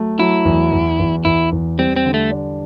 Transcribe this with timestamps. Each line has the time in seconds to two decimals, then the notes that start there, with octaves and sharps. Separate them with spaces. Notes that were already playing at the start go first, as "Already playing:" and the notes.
Already playing: F#3 A3
0.19 F#3 E4
0.45 E2
0.72 E2
1.00 E2
1.25 E2 E4
1.52 E2
1.78 G3 C4
1.96 C4
2.05 D3
2.14 A3
2.31 D4